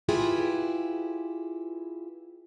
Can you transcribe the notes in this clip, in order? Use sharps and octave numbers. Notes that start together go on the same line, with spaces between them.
E4 F4 G4 G#4 B4